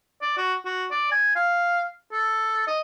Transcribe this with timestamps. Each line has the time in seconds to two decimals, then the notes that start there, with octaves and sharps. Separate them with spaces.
0.21 D5
0.37 F#4
0.65 F#4
0.91 D5
1.11 G#5
1.36 F5
2.13 A4
2.67 D#5